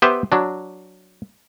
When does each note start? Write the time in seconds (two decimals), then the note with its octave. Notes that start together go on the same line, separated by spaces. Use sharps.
0.02 B3 G4 B4 C5 E5
0.32 F#3 D4